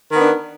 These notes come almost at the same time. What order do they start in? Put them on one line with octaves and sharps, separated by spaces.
D#3 B3 D4